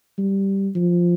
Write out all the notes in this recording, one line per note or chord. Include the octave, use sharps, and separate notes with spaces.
G3
F3